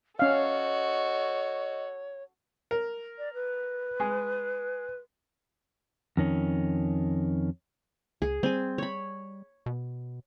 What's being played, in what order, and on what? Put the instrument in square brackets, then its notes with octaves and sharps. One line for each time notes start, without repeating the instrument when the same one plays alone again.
[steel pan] C#4 F5 [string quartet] F#4 A4 [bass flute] C#5 [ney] D#5
[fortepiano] A#4
[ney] D5
B4
[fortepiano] G#3 G#4
[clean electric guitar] F2 D#3 C#4
[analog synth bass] C#2 [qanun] G#4
[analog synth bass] G3 [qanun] C4 G#5
[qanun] C#5 B5
[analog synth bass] B2